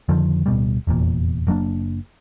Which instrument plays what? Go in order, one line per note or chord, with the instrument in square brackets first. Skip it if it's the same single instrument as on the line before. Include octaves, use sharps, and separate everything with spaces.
[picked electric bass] F2 D3 D#3 F3
D1 B2 G3
F1 E2 A#2
F#1 F#3 A#3 D4